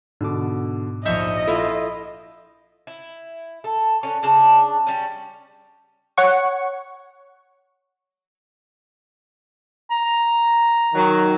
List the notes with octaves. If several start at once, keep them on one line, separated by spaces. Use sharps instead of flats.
G#2 B2 D3 D6
A#1 D#4 C#5 D#5 E5 G6
E4 F4 A4 F5
E4
A4
D3 C#4
C#3 D4 A5
G3 C#4
C#5 F#5 C#6
A#5
D#3 F#3